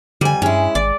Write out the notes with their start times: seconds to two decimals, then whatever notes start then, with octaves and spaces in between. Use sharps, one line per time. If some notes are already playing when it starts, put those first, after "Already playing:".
0.21 F2 D3 G3 G#5
0.42 G2 G#3 C#4 E4
0.75 G#1 D5